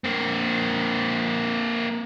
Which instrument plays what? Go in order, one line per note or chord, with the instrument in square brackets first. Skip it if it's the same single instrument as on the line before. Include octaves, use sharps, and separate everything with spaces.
[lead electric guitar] A#3 C4